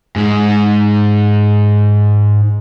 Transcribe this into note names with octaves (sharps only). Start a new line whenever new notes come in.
G#2 G#3